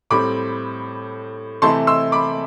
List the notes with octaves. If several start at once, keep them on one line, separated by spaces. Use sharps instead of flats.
A2 G3 C4 B5 D6
C3 E3 A3 C4 E4 A5 C6
C6 E6
B5 D6